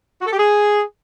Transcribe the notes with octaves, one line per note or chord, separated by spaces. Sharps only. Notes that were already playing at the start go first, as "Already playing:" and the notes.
F#4
A4
G4
G#4